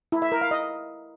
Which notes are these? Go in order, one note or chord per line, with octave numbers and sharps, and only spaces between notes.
E4
E5
A#4
F5
D#5